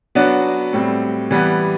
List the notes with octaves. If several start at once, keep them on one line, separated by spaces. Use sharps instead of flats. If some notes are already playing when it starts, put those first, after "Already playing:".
F#3 B3 D4 F#4
A2 G3 C4
E3 G3 B3